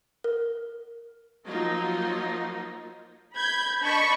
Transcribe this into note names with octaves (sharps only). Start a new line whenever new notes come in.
A#4
F3 F#3 A#3 D#4 F4 D#5
B5 G6 G#6
D4 D#5 A5 B5 C#6